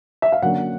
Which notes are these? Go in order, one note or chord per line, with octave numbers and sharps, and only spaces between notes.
E5
F5
D3 F#3 A#3 C#4 F#5